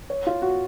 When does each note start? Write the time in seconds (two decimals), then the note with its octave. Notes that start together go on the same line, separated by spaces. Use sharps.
0.10 C#5
0.27 F4
0.42 F#4